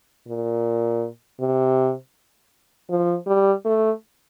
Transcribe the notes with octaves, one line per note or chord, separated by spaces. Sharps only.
A#2
C3
F3
G3
A3